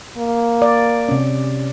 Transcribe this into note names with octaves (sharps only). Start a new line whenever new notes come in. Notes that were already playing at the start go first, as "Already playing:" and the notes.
A#3
D5
C3 C#4